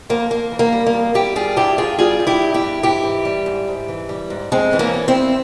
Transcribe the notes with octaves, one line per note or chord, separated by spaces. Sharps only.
F2 A#3
F2 A#3
E3
A#3
G3
A#3
F2
G3 E4 G4
G3 F4 G#4
G2 E4 G4
G2 F4 G#4
G3 F4 G#4
G3
E4 G4
G2
E4 G4
G2
G#2 E4 G4
E3
G3
G#2
G#2
E3
G3
G#2
F2 G#3 C4
E3
A#3 C#4
G3
C4 E4
F2